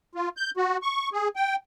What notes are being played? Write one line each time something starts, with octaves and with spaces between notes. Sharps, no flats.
F4
G6
F#4
C#6
G#4
G5